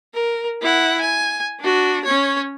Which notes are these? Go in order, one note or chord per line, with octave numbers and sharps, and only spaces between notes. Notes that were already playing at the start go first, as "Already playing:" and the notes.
A#4
E4 F#5
G#5
D4 F#4
C#4 C#5